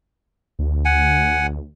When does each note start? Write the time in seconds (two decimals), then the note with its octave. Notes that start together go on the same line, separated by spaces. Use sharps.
0.59 D2
0.85 F#5 G#5